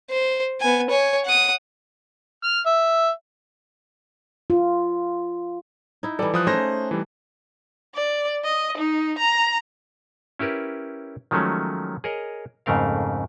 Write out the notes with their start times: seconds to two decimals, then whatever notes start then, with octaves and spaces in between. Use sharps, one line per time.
0.10 C5
0.61 B3 G#5
0.90 C#5 G#5
1.25 F#5 D#6
2.44 F6
2.66 E5
4.50 F4
6.03 D#4 E4
6.19 E3 G3 A4 D5
6.34 F3 D#6 F#6
6.47 A3 C#4 D#4 G#4 C5 A#6
6.91 E3 G3
7.95 D5
8.45 D#5
8.78 D#4
9.19 A#5
10.39 C#4 E4 G4 A#4 B4
11.31 D#3 F3 F#3 G#3 A3 C#4
12.04 G#4 A#4 C#5 D#5
12.66 F2 G#2 C#3 A3 A#4 F5